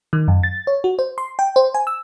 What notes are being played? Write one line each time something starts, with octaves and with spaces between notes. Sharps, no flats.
D#3
F#2
A6
C#5
F#4
C5
C6
G5
C5
G#5
E6